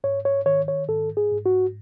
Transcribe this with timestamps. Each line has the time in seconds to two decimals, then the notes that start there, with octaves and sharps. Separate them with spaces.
0.04 G#2 C#5
0.25 C#5
0.46 D#3 C#5
0.68 C#5
0.88 G#2 A4
1.17 G#4
1.31 G#2
1.46 F#4